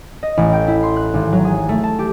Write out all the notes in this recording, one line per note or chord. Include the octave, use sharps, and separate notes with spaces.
D#5
A1
G5
E4
C6
F#6
G#1
F#3
G#4
A3
A5
G4